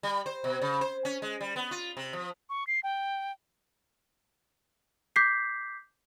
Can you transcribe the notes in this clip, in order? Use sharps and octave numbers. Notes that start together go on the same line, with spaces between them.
G3
C5
B2
C#3
C5
C#4
G#3
G3
B3
F4
C3
F3
C#6
C7
G5
D6 G6 B6 C7